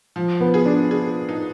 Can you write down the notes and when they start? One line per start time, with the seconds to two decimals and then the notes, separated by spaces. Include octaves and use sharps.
0.16 F3
0.41 B3
0.54 G#4
0.66 D4
0.91 G#4
1.29 D#4